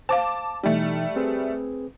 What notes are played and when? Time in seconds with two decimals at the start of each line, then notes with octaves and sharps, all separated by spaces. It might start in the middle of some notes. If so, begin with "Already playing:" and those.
0.09 C5 F5 A5 D6
0.63 B2 E3 G3 A3 D#4
1.16 C4 G#4 B4